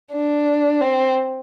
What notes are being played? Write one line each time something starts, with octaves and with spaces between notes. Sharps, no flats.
D4
C4